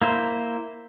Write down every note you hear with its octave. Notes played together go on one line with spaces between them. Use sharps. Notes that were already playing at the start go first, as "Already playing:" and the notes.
A#3 E4 C5